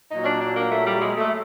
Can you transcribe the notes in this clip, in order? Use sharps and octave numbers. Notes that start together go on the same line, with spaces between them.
A#2 F#3 D#4
C#4
D4
D4
A#3
A3
G3
G#3
A3